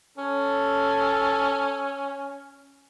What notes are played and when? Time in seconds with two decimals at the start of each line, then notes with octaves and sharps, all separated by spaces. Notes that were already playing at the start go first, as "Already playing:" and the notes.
0.18 C#4 A4